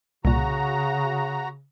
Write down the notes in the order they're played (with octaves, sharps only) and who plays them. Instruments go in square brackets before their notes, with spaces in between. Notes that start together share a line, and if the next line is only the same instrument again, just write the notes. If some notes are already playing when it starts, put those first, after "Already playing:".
[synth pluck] C2 A#2 [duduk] C#3 [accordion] F#4 A#5